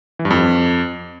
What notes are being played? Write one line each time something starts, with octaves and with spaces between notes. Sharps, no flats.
E3
G2
F2